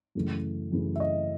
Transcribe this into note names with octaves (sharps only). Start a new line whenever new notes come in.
F#2 C#3 E3 A3
F#2 C#3 E3 A3
E5
D#5